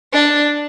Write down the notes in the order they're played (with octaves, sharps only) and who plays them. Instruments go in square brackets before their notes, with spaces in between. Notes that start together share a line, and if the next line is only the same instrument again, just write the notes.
[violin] D4